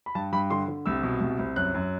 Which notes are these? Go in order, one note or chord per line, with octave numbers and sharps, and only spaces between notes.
B5
G2 A5
G2 B5
D3 C6
D3
C2 E6
B2
C2
C2
F#2 F#6
F#2